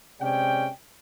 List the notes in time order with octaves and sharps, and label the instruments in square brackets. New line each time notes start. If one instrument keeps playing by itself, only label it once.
[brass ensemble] C3 G#3 C#4 D5 G5